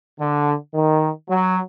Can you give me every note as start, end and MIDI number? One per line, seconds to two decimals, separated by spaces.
0.19 0.54 50
0.74 1.08 51
1.29 1.59 54